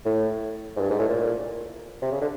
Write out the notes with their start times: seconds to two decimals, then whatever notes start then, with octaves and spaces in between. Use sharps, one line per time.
0.05 A2
0.76 G#2
0.80 G2
0.90 G#2
0.99 A2
1.09 A#2
2.02 C3
2.12 C#3
2.21 D3